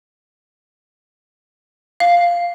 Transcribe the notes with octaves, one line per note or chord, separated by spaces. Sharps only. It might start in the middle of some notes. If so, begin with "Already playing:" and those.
F5